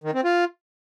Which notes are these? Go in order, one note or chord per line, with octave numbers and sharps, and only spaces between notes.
D#3
C4
F4